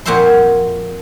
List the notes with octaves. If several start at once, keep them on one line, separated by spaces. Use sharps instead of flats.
F2 A#2 F#4 C5 E5 C6